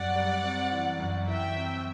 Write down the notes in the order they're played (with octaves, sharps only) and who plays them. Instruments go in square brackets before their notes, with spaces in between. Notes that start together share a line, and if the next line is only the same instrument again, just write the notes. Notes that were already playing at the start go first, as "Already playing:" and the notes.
Already playing: [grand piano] F#2 G3 [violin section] D5 F#5
[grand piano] G3
C4
E3
F#2
[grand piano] E3 [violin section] E5 G5
[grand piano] C4